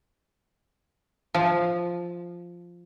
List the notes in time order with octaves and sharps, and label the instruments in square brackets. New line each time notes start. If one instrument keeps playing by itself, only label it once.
[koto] F3